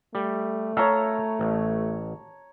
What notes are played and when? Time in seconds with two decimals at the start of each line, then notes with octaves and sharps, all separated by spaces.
0.15 G3 A3
0.77 A4 C#5 E5 F5 A5 A#5
1.39 A1